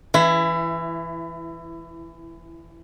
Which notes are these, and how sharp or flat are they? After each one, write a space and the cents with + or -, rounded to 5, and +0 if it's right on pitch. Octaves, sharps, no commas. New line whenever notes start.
E3 +5 E4 +25